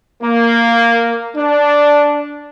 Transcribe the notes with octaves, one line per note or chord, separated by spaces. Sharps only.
A#3
D4